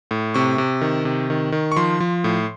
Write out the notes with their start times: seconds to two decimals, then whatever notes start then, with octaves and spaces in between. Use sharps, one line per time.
0.11 A2
0.34 C3 C#6
0.58 C3
0.81 D#3
1.05 C3
1.30 D#3
1.52 D#3
1.72 C#6
1.76 F3 C6
2.00 F3
2.24 A2